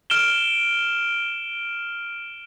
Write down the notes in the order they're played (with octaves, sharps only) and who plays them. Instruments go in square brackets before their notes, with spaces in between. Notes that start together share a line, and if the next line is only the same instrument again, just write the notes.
[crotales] F6 D7 E7 G7